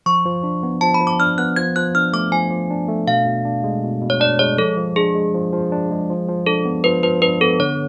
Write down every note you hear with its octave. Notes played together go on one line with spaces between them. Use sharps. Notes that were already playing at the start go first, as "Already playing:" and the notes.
F3 C#6
F3
D4
B3
F3 A5
B5
F3
D6
D4 F6
B3 F#6
F3 G#6
F3 F#6
D4 F6
A3 D6
F3 G#5
F3
D4
A3
B2 F5
B2
D4
G#3
B2
B2
C#5
D4 D5
G#3 C#5
F3 A4
F3
D4 G#4
G#3
F3
F3
D4
G#3
F3
F3
D4 A4
B3
F3 B4
F3 B4
D4 B4
B3 A4
D3 C#5